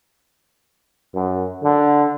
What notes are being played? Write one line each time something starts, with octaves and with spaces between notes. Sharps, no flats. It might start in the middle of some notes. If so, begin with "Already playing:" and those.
F#2
D3